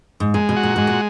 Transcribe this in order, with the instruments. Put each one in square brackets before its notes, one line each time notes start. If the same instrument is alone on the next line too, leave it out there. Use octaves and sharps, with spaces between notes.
[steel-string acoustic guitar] G#2
[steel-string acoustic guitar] A#2 [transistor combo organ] G#3
[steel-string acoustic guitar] B2
[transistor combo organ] F#4
[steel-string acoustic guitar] A#2
[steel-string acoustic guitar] G#2 [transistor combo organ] G#3
[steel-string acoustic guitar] A#2